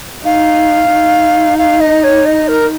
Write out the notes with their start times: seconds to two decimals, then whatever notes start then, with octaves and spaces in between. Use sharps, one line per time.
0.24 D#4 F5
0.91 D#4
1.58 F5
1.80 D#5
2.03 C#5
2.25 D#5
2.48 A#4